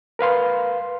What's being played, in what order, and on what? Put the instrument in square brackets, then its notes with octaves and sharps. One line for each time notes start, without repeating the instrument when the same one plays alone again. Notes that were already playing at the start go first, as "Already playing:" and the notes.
[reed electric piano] A#4 B4 F5 C6